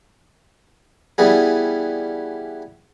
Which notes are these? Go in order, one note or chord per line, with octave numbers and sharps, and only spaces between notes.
E3 G3 B3 G#4